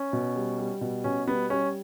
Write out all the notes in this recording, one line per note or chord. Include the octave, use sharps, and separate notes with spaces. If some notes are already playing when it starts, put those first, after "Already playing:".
Already playing: C#4
B2
G3
G3
B2
B2 C#4
G3 B3
G3 C#4